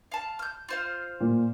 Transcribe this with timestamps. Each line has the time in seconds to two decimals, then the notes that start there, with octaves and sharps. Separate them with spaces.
0.12 F5 A5
0.39 F6 G6
0.69 F4 C5 F5
1.20 A#2